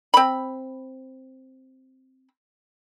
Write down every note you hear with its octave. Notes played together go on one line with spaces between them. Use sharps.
C4 B5